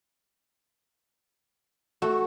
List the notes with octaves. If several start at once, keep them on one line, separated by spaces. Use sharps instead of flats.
A3 F#4